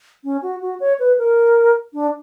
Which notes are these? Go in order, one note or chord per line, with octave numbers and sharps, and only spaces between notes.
C#4
F#4
F#4
C#5
B4
A#4
D4